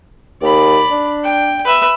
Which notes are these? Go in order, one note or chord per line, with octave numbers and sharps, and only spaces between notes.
D#2 D5 B5
D4
G5
B4 E5